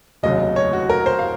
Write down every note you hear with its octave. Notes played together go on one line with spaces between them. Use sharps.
F1 D#2 C#3 F#3 D#5
C#5
F#4
A#4
C5
F5